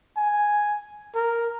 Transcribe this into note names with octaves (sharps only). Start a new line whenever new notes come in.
G#5
A#4